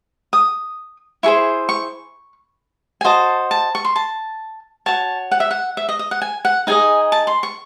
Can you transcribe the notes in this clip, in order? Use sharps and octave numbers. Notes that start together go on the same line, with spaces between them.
D#6
E4 G#4 C5 C#6
C#6
G#5
F#4 C5 D#5 A5
A5
C#6
C6
A5
F#4 C#5 A5
F#5
E5
F#5
E5
D#5
D#5
F#5
G#5
F#5
D#4 G#4 D#5 G#5
A5
C6
C#6